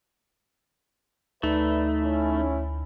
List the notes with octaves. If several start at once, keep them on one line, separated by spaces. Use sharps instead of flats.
D2 A3 D#4 B4 D5 E5
C#4 E4